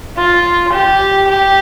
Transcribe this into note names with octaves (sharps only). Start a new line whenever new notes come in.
F4
G4
G4